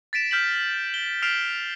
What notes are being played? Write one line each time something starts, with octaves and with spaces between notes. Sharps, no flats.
A6 B6 D7 E7
F6 G6 B6 F#7
G7
F6 B6 C7 D7 E7 F7